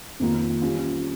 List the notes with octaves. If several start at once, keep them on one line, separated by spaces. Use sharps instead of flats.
F2 D#3 A#3 F4
G3 C#4 F4